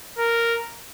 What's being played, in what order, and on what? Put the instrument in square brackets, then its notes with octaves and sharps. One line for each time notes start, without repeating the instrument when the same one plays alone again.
[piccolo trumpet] A#4